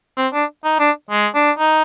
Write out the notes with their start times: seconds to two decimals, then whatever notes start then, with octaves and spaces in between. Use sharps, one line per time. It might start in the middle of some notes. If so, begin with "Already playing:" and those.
0.17 C4
0.33 D4
0.64 D#4
0.79 D4
1.11 G#3
1.35 D4
1.58 D#4